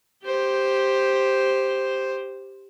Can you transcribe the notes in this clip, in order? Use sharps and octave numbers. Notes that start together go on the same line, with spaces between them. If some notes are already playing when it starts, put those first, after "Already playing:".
G4 C5